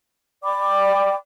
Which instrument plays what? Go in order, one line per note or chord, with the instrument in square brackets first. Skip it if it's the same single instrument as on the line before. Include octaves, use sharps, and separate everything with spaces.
[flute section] D5 G5 B5 D6